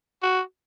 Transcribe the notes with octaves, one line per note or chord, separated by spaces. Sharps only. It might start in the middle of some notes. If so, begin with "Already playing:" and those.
F#4